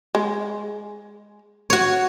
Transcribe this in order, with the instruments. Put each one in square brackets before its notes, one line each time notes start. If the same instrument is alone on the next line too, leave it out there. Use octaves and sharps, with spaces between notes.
[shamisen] G#3
[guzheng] F#4 C#5